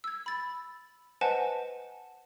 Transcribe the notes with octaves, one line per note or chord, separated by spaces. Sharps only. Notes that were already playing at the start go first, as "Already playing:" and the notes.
E6 G#6
B5 A6
B4 C5 D#5 F#5 G#5 A5